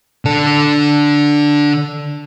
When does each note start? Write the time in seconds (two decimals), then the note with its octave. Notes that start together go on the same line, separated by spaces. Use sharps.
0.25 D3 A4